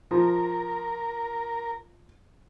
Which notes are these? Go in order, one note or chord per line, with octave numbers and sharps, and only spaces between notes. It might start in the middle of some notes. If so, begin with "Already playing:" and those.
F3 A#4